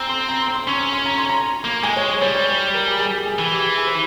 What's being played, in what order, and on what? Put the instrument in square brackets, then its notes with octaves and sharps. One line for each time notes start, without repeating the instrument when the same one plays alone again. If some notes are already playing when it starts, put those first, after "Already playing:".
Already playing: [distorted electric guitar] C4 [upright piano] G#5 A#5
[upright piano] C6
A#5
C6
C6
[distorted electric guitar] C#4 [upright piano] C#6
[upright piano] C6
C6
A#5
C6
A#5
[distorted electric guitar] A#3
[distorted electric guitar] G#3 [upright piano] G#5
[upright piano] C#5
C#5
[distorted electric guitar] G3 [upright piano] C#5
[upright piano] C#5
C#5
A#4
G#4
G#4
G4
G#4
[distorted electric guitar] E3 [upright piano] G#4
[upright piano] G4
G4
G#4
C5